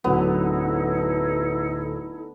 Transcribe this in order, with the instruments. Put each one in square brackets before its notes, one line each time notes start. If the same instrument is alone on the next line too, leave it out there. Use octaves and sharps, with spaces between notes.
[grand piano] D1 F#3 [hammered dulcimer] D3 B3 [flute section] D#4 E4 A4